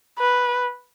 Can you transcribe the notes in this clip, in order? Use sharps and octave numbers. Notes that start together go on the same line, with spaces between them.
B4